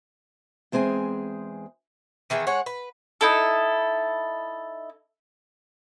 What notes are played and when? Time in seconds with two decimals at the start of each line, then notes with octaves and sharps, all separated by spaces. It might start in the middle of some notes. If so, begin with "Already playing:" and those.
0.72 E2 G#3 C4 G#4 G#5
2.30 D#3 E3 B3 G#4
2.47 G#3 C#5 F#5
2.66 B4
3.21 D#4 E4 A4